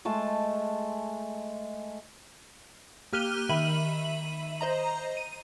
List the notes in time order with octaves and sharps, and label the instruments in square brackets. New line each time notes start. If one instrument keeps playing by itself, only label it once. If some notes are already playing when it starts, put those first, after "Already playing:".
[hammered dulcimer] G#3 A3 A5 C6
[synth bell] A#3 G4 F6 F#6 D#7 G7
D#3 E5 B5 D#7 F#7
C5 D#5 A#5
D#7